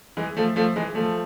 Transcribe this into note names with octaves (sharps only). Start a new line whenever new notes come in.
E3 G#3
F3 A3
F3 A3
E3 G#3
F3 A3